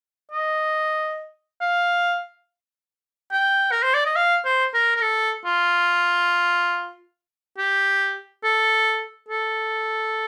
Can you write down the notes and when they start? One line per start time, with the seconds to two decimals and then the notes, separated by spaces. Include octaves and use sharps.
0.32 D#5
1.61 F5
3.32 G5
3.71 A#4
3.83 C5
3.94 D5
4.05 D#5
4.16 F5
4.45 C5
4.74 A#4
4.96 A#4
5.02 A4
5.45 F4
7.58 G4
8.44 A4
9.29 A4